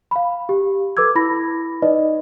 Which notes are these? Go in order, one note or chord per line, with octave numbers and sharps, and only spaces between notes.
F5 B5
G4
A4 B4 D6 E6 G#6
E4 B5 A#6
D#4 B4 D5 D#5